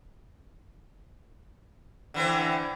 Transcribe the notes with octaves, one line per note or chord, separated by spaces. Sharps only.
D3 E3 C4